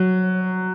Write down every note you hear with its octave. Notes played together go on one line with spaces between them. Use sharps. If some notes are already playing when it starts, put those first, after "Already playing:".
Already playing: F#3